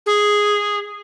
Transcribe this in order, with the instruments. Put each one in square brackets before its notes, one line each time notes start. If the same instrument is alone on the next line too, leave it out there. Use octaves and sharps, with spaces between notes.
[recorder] G#4